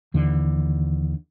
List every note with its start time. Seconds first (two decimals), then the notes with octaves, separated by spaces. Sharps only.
0.14 D#2 D3 E3